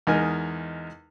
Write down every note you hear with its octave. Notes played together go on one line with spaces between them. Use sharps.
E2 G#3 D#4 A#4 G#5